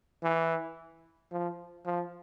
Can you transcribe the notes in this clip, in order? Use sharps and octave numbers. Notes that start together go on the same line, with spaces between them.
E3
F3
F3